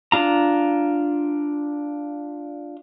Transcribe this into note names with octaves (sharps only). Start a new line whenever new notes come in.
D4 F4 A#5